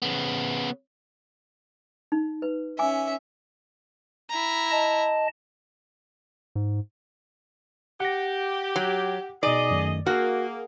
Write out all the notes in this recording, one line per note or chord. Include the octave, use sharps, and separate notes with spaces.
C#3 B3
D#4
B4
C#4 E5 G#5 D6
E4 A#5
D#5 A5
G#2
G4 F#5 A#6
F#3
B2 D#4 G#4 D5 D#5
F#2 D#3 A3
A#3 F#4 G#4 A#4